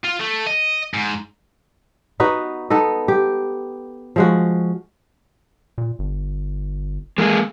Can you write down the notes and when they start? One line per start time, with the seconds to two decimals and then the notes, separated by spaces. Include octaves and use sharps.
0.05 F4
0.21 A3
0.47 D#5
0.94 G#2
2.20 B3 D#4 F#4 B4
2.70 B3 D#4 A4 D#5
3.08 G4
4.16 F3 G#3 F#4
5.78 A#2
5.99 G1
7.18 E3 G#3 A#3 G#4